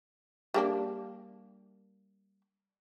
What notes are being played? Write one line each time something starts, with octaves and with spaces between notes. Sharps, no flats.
G3 A#3 D4